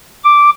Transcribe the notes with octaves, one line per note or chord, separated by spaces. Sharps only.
D6